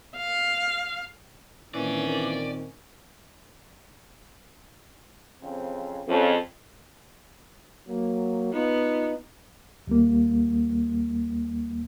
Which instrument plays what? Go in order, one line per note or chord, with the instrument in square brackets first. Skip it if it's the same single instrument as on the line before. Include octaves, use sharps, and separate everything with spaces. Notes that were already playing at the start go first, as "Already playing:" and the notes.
[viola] F5
[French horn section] A#2 D#3 C4 [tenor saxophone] E3 [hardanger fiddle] C#4 [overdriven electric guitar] D5
[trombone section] F2 C#3 C4
[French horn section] F2 [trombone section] C#3 C#4
[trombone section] F#3 A#3
[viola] B3 [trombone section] D#4 F4
[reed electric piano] D#2 G3 A#3